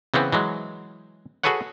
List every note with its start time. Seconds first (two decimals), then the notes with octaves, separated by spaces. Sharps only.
0.14 C#3 E3 B3 C4
0.32 E3 F#3 G#3
1.44 F#4 G#4 A4 B4 C#5 F#5